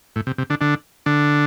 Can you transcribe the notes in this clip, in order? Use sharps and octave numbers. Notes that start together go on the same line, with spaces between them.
A2
C3
C3
D3 D4
D3 D4
D3 D4